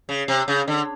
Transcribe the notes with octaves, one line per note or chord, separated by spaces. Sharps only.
C#3
C3
C#3
D3